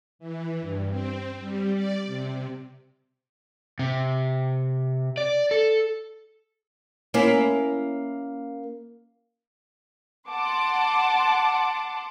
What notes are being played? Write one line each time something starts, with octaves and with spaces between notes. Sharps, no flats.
E3
G2
C4
G3
D5
C3
C3
D5
A4
A#3 C#4 E4
F#5 A5 C6 D6